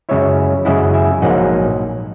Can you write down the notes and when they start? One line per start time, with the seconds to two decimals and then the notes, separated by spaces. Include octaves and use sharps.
0.09 F#2 C#3 G#3 C#4 E4 C#5 E5
0.65 F#2 C#3 G#3 C#4 E4 D#5 F#5
0.94 E5 G#5
1.22 A#1 G#2 F#3 A#3 D#4 D#5 F#5